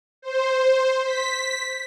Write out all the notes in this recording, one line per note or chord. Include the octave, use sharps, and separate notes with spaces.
C5
B6